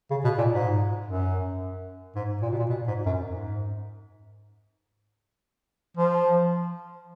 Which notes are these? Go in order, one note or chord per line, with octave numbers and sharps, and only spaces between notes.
C#3
B2
A#2
G#2
F#2
G#2
A#2
B2
A#2
B2
G#2
F#2
G#2
F3